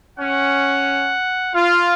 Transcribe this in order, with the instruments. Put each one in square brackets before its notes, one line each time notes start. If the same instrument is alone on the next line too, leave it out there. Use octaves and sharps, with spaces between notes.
[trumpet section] C#4 [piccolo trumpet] F#5
[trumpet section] F4 [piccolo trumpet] F5